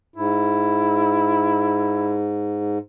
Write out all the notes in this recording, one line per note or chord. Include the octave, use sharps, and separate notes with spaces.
G#2 E4